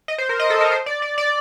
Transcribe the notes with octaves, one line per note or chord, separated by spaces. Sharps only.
D#5
C5
A#4
D#5
A4
A#4
C5
D5
D5
D5